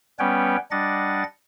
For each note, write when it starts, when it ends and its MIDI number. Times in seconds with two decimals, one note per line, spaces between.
0.19 0.57 55
0.19 0.57 59
0.19 0.57 61
0.19 0.57 71
0.19 0.57 73
0.19 0.57 79
0.71 1.24 55
0.71 1.24 62
0.71 1.24 75
0.71 1.24 78
0.71 1.24 93